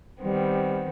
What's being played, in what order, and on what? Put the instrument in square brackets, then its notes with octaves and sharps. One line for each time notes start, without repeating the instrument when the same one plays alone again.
[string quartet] D#3 B3 C4 [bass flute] G3